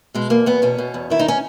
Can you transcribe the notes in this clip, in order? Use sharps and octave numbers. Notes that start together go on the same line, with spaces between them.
B2 G#3
E2 A#3
E2 B3
B2 C#4
B2
E2
D#3 E4
D#4
C#4